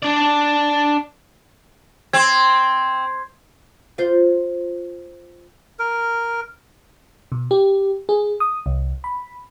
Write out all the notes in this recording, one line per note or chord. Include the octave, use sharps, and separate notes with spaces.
D4 D5
C4 C6 G#6
F4 C5
A#4
B2
G4
G#4
D#6
C2
B5